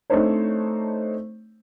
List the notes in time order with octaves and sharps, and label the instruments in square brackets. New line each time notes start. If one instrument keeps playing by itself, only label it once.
[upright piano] A3 C4 D4 D#4 C5 C#5